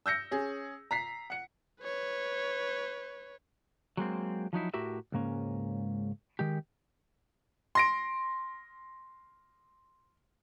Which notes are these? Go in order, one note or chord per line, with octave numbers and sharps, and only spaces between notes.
E6 G6 A#6 C#7
C#4 G#4
A#5 B6 C7
F#5 C#7
B4 C#5
F#3 G#3 A#3 C4
F3 F#3 D#4 E4
A2 F#4 G4 A#4 E5
C#2 G#2 A#3 C#4
D#3 G#3 G4
C6 A#6 D7